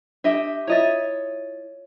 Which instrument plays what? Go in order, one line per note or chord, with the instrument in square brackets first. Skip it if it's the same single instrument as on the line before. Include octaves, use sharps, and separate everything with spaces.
[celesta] D4 [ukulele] G4 D#5 E5
[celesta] E4 F4 A6 [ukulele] C#5 D#5 E5